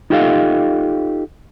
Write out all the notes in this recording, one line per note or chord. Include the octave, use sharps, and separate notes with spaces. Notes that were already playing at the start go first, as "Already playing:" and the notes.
D#4 F4 G4 A4 D#5 F5